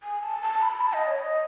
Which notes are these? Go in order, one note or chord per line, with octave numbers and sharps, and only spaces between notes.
G#5
A5
A5
B5
A5
D#5
C#5
D#5